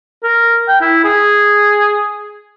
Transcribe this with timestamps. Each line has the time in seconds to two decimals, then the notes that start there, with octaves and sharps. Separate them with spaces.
0.23 A#4
0.68 G5
0.81 E4
1.04 G#4